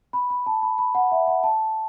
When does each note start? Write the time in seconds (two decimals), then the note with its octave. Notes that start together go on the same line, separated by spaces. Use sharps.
0.13 B5
0.30 B5
0.46 A5
0.62 B5
0.78 B5
0.95 F#5
1.12 E5
1.27 F#5
1.44 A5